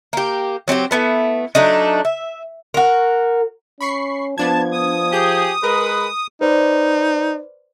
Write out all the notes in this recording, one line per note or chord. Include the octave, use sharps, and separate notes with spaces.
A#3 G4
F#3 C4 D#4 G4
A3 B3 E4
F#3 A3 D4 D#4
E5
F#4 A#4
C#4 B5 C#6 C7
F3 B3 D4 A5 G#6
D#6
G4 G#4 G6
G#3 A#4 B4
D#4 B4 C5 D5